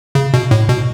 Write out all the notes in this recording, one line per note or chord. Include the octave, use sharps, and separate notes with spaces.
C#3
B2
A2
B2